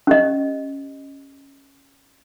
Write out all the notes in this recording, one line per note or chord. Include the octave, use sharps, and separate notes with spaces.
C#4 G4 D#5